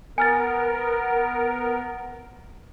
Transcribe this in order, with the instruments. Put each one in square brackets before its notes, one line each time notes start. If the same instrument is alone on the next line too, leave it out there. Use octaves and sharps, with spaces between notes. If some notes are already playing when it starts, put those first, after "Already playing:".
[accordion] B3 A#4 [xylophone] G#5 F6 A6